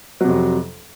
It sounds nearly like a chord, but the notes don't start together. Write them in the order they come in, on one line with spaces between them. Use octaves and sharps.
F#3 C3 F2